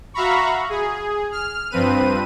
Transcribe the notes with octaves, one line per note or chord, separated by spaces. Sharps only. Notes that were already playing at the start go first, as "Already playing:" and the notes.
F#4 E5 F5 A#5 B5 C#6
G#4
F6
G2 F3 C4 B4 D#7